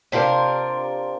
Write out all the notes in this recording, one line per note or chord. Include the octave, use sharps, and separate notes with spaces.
C3 D4 F4 A#4